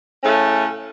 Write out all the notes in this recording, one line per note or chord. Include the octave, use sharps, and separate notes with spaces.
A2 C#3 A3 C#4